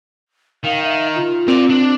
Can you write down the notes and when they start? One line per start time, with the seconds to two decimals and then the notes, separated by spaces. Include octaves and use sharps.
0.64 D#3 F5
0.83 E5
1.15 F4
1.48 C4 A#4 D5
1.70 D4